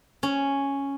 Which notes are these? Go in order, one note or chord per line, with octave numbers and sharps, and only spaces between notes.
C#4